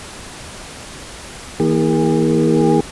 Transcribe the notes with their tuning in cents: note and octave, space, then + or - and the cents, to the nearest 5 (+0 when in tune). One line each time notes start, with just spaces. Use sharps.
E3 -45 A#3 +10 G#4 -40